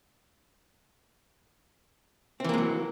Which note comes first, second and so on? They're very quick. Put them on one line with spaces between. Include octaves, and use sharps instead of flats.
C4 E3 A#3 G#3 F#3